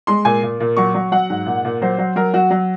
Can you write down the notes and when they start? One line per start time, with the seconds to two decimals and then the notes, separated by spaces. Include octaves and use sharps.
0.07 G#3 C6
0.25 A#2 G#5
0.43 A#2
0.60 A#2
0.77 F#3 C#6
0.95 F#3
1.12 F#3 F#5
1.30 G#2
1.46 A#2
1.65 A#2
1.82 F#3 C5
1.98 F#3
2.16 F#3 A#4
2.34 F#3 F#4
2.51 F#3